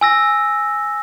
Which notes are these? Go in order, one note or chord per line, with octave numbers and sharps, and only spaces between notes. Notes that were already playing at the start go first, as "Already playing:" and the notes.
G#5 E6 A#6